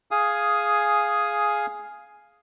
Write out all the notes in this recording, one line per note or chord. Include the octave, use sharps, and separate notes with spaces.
G#4 F5 G#5 D#6